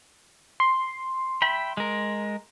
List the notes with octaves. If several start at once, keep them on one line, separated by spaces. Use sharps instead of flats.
C6
E5 G5 B5
G#3 A#4